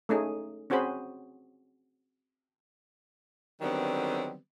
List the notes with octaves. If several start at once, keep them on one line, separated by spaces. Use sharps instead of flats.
A3 C#4 D#4 G#4
C4 C#4 F#4 G#4 C5 B5
D3 D#3 F#3 G3 B3 C4